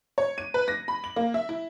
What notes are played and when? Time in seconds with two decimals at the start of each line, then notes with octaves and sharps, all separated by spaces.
0.18 C#5
0.38 D#7
0.54 B4
0.68 A#6
0.88 B5
1.04 F#7
1.16 A#3
1.34 E5
1.49 E4